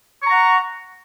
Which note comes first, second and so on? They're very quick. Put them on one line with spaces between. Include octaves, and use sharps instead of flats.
C#6 A#5 F#5